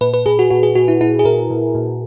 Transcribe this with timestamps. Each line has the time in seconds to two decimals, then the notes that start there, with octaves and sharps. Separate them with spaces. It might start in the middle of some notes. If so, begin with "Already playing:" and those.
0.01 A#2 B4
0.14 B4
0.26 A#2 G#4
0.39 F#4
0.50 A#2 F#4
0.63 G#4
0.75 A#2 F#4
0.88 E4
1.01 A#2 E4
1.19 G#4
1.25 A#2 A#4
1.50 A#2
1.75 A#2